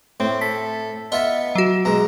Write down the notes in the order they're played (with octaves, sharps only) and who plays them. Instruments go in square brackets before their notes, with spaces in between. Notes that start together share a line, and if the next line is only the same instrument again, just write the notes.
[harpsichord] A2 [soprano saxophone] C4
[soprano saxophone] A4 [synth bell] B6
[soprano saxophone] B3 [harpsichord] F4 E5 A5 [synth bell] D#5
[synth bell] F#3 F#4
[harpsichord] B2 G#3 [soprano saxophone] A#5